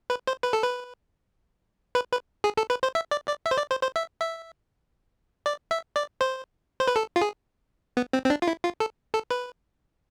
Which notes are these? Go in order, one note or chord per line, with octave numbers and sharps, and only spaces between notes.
B4
C5
B4
A4
B4
B4
B4
G#4
A4
B4
C5
E5
D5
D5
E5
C5
D5
C5
C5
E5
E5
D5
E5
D5
C5
C5
B4
A4
F4
G#4
B3
C4
C4
D4
F4
E4
F4
A4
A4
B4